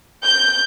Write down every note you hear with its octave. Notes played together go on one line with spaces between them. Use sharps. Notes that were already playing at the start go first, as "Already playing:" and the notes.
G6